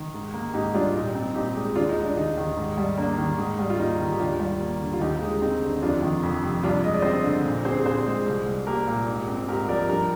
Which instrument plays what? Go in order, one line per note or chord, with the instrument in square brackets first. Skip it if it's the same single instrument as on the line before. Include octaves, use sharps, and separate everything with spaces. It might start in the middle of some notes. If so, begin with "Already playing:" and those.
Already playing: [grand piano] D#3
G#2
A#3
G#2 D#4 G4
G3 D4 F4
A#2 D#4
C4
A#2 D#4 G4
G#3
D#2 D4 F4
D#4
G#3
D4
D#2 D#4
D#3
G#2
G3
A#3 D4
D#3
G#2
G3
F4
A#3 D#4
D#3
G4
D#2 D4 F4
G3
A#3
D3
F4
D#2 D#4 G4
G#3
C4 D#4
D3
F2 D4 F4
D#3
F2
C3
G2 D4 F4
G#3 D#5
D5
C4 C5 D#5
D3
A#2
C4 G#4 C5
A#2 G#4 C5
G#3
C2
G3
A#3 G4 A#4
A#2
G#2
C4
G#2 G4 A#4
F3 A#4 D5
G2 G4 A#4